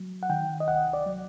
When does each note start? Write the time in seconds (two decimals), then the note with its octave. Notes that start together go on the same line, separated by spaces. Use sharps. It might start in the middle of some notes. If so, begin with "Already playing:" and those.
Already playing: F#3
0.23 F#5
0.30 D#3 G5
0.60 D#5
0.68 C2 F#5
0.93 D5
1.06 F#3